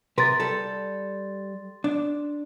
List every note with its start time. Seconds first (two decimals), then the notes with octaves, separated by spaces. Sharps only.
0.18 C3 A#4 B4 C6 A6
0.40 G3 A4
1.84 D4